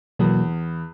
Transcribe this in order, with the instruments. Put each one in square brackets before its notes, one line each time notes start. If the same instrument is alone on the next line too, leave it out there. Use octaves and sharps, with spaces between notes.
[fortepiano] E2 [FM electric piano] B2 F#3 A#3